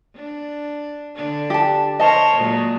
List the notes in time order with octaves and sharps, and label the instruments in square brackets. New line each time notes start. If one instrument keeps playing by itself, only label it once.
[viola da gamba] D4
D3 D4
[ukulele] G4 A5
[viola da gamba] A#4 C5 C#5 [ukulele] D#5 A5
[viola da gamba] A#2 F#3 G#3